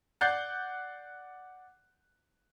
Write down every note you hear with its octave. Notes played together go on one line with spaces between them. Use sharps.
D5 F#5 F#6 G6 A6 C7